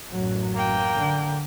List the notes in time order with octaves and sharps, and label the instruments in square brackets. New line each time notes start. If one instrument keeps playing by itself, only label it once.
[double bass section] A1 F#2 F#3
[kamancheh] A#3 G5
[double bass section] D3